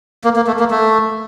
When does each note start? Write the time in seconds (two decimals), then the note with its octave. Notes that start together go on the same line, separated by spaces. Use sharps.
0.24 A#3
0.36 A#3
0.47 A3
0.59 A#3
0.71 A3